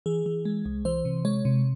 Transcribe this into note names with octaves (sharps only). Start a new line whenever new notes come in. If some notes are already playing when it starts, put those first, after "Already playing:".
E3 G#4
E3
G#3
C2
E3 C5
C3
G#3 C#5
C3